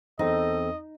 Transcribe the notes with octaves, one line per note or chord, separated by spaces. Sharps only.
E2 C4 D#4 A4 D#5